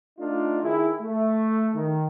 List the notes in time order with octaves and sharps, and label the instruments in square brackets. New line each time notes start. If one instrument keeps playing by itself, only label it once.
[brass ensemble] A3 D4 D#4 F4
D#3 E4 G#4
A3
D#3